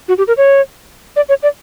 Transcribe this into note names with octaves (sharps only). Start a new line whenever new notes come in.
F#4
G4
A#4
C#5
D5
C#5
D5